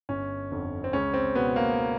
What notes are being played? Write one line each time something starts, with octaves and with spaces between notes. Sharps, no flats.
G1 C#4
F2 D3
C4
C#2 C#4
C4
B2 B3
A#3